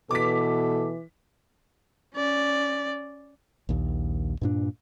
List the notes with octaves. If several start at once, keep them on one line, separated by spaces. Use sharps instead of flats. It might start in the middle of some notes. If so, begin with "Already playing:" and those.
B2 E3 A4 D6 B6
C#4 D5
A#1 D#2
G2 A#2 D4